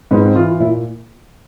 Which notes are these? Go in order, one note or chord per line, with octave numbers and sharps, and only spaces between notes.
G#2 B3
C4
E3 F4
F4
A#2 E4